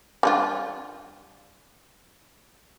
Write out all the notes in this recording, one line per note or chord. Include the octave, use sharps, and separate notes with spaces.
G3 D4 F4